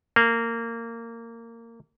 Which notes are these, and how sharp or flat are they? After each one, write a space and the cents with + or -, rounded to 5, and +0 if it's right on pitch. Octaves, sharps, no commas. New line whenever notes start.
A#3 -20